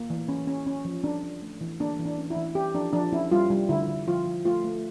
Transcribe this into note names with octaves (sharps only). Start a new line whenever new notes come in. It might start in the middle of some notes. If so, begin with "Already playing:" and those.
Already playing: A#3
E3
C#4
C#4
C#4
F3
C#4 D4
C#4
A3
E3
A#3 D4
E3
D4
C#4
E4
E3
C#4 G4
F3 D4
F3 D4
C#4 E4
G3 F4
G3
D3 E4
D3
F3 F4
F3
A3 F4
A3